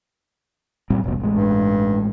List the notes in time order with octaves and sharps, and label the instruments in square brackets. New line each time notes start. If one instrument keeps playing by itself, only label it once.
[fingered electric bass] A#2 G3 C4
E1 A#1 B2
A1 G#3
[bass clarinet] G2